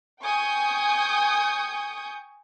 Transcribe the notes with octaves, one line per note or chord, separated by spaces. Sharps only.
G5 G#5 C#6 D#6 G6